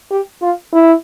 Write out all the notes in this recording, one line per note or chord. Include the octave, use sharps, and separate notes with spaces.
G4
F4
E4